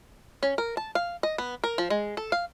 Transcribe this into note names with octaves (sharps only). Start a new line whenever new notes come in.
C#4
A#4
A5
F5
D#5
B3
A#4
F3
G#3
A4
F5